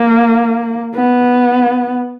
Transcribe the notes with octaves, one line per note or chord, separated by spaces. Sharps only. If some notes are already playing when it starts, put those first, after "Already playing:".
Already playing: A#3
B3